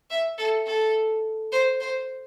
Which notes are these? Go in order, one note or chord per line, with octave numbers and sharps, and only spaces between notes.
E5
A4
A4
C5
C5